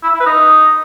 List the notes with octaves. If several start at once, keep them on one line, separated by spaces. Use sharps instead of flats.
E4
E5
E4
B4
D#4